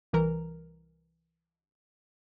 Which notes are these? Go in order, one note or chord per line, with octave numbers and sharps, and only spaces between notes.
C2 E3 A#4 A#5